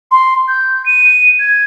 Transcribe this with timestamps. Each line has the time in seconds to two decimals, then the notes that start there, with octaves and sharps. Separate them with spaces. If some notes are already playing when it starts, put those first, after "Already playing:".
0.11 C6
0.48 G6
0.86 D#7
1.39 G#6